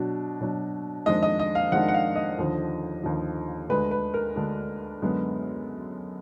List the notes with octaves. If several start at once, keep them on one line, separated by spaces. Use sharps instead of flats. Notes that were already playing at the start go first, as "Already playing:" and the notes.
Already playing: B2 F#3 D4
B2 F#3 D4
F2 D#3 G#3 D4 D#5
D#5
D#5
F5
F2 D#3 G#3 D4 F#5
F#5
F5
D#5
D#2 D3 F3
D#2 D3 F3
D2 D3 G#3 D4 B4
B4
A#4
D2 D3 G#3 D4
F#2 D3 G#3 B3